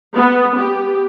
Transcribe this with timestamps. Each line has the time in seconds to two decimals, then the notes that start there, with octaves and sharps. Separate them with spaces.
0.14 B3
0.58 G4